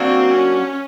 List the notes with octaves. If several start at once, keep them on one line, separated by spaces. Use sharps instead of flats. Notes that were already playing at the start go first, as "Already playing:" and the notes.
Already playing: F#3 A#3 C4 D4 F#4
C#4